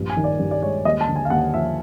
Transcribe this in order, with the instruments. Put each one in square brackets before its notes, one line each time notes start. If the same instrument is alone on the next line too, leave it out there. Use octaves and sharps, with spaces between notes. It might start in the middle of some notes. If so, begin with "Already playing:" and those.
Already playing: [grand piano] A#1 G2 F3
G#5
D#3
D5
G2
D5
G#3 C#5
D#2 D#5
A5
D3
G#5
F5
D#2 F#5
F3 E5